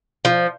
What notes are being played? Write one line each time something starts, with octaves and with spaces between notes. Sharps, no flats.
F3